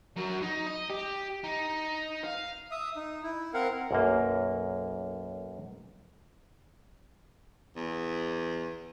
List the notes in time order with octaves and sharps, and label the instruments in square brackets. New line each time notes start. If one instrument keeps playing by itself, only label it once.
[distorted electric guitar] F#3 A#4
D#4
D#5
G4
D#4
F5
[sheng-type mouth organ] E5 D#6
D#4
E4
C4 A#4 F5 F#5
[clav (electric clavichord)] B1 F#2 A#3
[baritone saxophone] E2